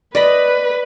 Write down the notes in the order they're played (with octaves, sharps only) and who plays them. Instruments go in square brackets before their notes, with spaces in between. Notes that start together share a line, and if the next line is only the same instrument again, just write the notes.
[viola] B4 [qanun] D5 D#5 B5